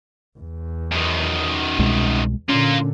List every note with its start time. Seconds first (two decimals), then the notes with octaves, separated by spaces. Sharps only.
0.38 E2
0.92 F#2 D#3
1.79 C2 B2 G#3
2.49 A#2 D3 A#3 C#4 F4